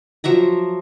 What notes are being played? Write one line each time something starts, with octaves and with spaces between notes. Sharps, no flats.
F3 F#3 E5 A#5